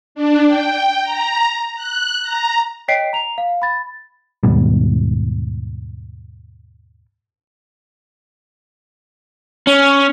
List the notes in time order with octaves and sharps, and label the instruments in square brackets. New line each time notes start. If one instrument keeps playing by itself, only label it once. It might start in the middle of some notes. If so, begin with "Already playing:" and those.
[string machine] D4
G5
A#5
F#6
A#5
[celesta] C#5 D#5 G5 B6 C7 D7
A#5 F7
F5
B5 A6
[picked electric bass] D#2 G#2 B2 G3
[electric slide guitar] C#4